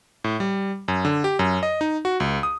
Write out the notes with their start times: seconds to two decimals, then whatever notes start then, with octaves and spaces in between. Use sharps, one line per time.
0.24 A2
0.40 G3
0.88 F#2
1.05 D3
1.24 G4
1.39 F#2
1.63 D#5
1.81 D#4
2.05 F#4
2.20 C#2
2.43 D#6